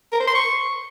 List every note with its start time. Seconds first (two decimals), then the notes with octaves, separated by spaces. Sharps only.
0.12 A#4
0.20 C5
0.27 C6
0.35 C#6